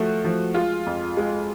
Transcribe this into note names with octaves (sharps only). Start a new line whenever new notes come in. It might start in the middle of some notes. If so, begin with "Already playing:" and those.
Already playing: F3 A3 F#4
F3
G#3 F4
F2
G#3